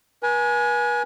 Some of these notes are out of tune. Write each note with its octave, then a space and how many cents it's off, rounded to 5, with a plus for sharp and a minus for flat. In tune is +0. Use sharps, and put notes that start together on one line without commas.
B4 -45 G#5 +10